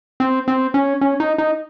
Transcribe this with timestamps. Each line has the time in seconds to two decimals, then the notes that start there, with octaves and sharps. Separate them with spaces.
0.20 C4
0.48 C4
0.74 C#4
1.01 C#4
1.20 D#4
1.38 D#4